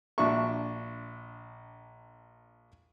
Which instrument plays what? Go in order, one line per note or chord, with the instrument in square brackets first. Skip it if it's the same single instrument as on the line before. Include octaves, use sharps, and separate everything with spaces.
[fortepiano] A#1 D4 F#4 E5 C#6